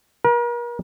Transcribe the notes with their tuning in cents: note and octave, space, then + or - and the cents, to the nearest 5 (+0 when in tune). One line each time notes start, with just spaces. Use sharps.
A#4 +40